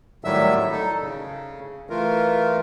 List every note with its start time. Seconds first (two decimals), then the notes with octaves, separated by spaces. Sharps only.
0.25 A2 D#3 F#3 G3 E5 E6
0.71 D#4 A4
1.01 C#3
1.90 E3 A3 F4 A#4